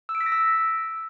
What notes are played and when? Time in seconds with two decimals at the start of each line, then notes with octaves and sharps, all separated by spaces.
0.09 E6
0.15 D7
0.21 B6
0.26 A#6
0.32 E6